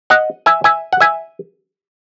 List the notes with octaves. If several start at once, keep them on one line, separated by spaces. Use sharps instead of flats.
D#5 F#5
E5 G#5
E5 G#5
F#5
E5 G#5